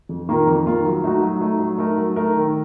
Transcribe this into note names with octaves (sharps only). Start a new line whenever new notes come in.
F2
D#3 A#3 F4 A#4
F2
D#3 A#3 F4 A#4
F#3
A3 D#4 F#4
F#3
A3 D#4 F#4
F#3
A3 D#4 A#4
F#3
A3 D#4 A#4
D#3